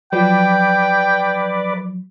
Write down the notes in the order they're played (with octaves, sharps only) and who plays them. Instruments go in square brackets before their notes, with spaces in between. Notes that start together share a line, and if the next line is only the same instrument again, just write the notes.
[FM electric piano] F3 F#3 [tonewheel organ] B4 D5 [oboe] G5